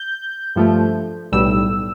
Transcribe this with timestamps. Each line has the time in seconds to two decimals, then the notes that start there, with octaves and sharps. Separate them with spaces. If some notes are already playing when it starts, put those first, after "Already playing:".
Already playing: G6
0.56 G2 F3 A3
1.32 B1 A2 G3 E6